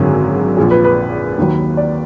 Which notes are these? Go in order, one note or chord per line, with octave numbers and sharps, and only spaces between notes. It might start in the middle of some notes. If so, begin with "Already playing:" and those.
Already playing: G#1 F#2 D3 G#4
A#1 A#2 F3 G#4
B4
B4
D#2 D#3 F#3
D5